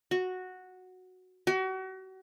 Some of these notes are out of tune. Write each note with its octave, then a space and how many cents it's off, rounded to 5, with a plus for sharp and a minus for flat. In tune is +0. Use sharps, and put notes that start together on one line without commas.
F#4 -5
F#4 +35